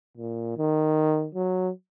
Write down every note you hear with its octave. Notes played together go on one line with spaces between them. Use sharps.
A#2
D#3
F#3